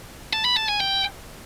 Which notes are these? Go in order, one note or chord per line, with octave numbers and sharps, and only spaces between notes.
A5
B5
A5
G#5
G5